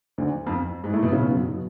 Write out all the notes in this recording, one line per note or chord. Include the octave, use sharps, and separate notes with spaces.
D2 D3
F2 F3
G#2 G#3
A2 A3
B2 B3
C#3 C#4
B2 B3
F#2 F#3
B2